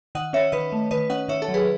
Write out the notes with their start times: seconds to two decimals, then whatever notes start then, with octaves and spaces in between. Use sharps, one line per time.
0.15 D#3 D#5 F#5
0.33 C#4 C#5 E5
0.52 D#3 B4 D#5
0.72 A3
0.91 D#3 B4 D#5
1.10 C#4 D#5 F#5
1.28 D#3 C#5 E5
1.42 A4 C#5
1.48 F#3
1.54 G#4 B4